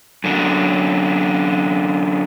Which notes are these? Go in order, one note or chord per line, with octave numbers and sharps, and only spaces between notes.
F#2 D3